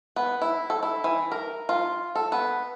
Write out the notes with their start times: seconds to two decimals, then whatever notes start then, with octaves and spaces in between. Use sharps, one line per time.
0.16 B3
0.42 E4
0.70 A4
0.83 E4
1.04 E3
1.32 A#4
1.69 F4
2.15 A4
2.32 B3